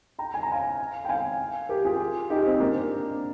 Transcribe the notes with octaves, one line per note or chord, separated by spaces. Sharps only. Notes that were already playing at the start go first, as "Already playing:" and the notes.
G5 A#5
G#5
A#5
F5 G#5
G5
F5 G#5
G4 A#4
F4 G#4
D#4 G4
C4
A#3 D4